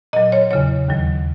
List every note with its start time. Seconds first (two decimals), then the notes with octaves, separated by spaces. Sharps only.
0.13 A#2 F#3 D#5
0.32 C#5
0.51 E2 C#3 F#3 C#5
0.88 D#2 D#3 F#3